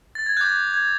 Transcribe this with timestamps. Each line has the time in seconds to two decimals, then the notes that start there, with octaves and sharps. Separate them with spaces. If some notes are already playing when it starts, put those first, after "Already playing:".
0.15 A6
0.26 G#6
0.37 D6 F#6 G6
0.74 G#6